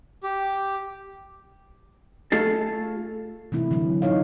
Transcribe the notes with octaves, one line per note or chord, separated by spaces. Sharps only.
G4
A3 F4 G#4 A4
C3 E3 A3 E4
D3 E3 F#3
D#4 F4 C#5 F5